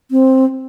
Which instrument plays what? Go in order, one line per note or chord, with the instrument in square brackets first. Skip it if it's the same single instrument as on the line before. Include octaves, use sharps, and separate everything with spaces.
[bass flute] C4